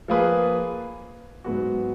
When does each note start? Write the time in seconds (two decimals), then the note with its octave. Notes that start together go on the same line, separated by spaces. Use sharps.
0.08 F3 A#3 F4 G#4 B4
1.44 G#2 F#3 B3 F#4